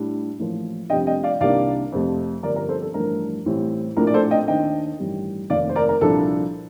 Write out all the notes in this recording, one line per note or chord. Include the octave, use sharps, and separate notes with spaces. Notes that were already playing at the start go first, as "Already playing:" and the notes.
Already playing: A2 G3 D4
A1 A2 F3 A#3
F1 F2 C3 G3 D4 D#5 G5
D#5 G5
D5 F5
C2 C3 D#3 A#3 D4 D5 F5
F2 C3 F3 A3
G1 G2 F3 A#4 D5
A#4
A4 C5
A4
A1 G2 F3 A3 D4 A#4
A1 A2 G3 C4
A#1 A2 A3 D4 A#4
D5
A4 C5
D#5 G5
D#2 D#3 A#3 D4 D#5 G5
A1 G2 D#3 G3
F1 D#2 D#3 D5 F5
C5
A#4 D5
A#4
C2 A#2 F3 A#3 D4 A4